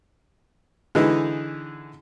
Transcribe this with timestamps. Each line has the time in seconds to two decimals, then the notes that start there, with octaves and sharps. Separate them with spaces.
0.95 D3 E3 G#3 D#4 E4